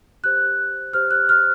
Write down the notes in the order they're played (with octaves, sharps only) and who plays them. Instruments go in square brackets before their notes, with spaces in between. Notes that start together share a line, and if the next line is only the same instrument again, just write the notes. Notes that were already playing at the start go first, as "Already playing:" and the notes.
[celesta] G4 C5 F#6
G4 C5 F6
F#6
F6